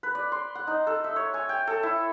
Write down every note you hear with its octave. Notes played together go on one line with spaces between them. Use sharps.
B4
D5
C6
F#5
D#4
A4
E5
C#5
G#5
G5
A4
E4